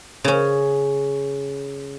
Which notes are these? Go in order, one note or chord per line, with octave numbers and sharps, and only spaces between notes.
C#3 C#4